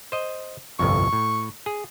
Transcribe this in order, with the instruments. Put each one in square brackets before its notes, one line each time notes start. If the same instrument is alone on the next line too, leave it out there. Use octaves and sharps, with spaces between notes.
[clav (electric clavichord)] C5 D#5
[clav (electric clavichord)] G1 C2 F2 [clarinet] C#6
[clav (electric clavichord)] A2
G#4